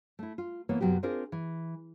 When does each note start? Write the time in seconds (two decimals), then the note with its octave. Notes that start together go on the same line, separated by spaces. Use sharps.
0.19 A3 E4
0.38 F4
0.69 E3 A#3 B3 C#5
0.81 F#2 C3 F#3 B3 G4
1.03 C4 D4 F4 G#4 A#4 C5
1.32 E3